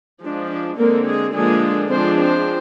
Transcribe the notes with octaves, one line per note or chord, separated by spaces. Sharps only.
F3 G#3 D4
D4
D3 G#3 A#3 C4 A#4
G#3 G#4
D3 F3 G#3 A#3 D4 G#4
F3 G#3 C4 D4 C5
C4 C5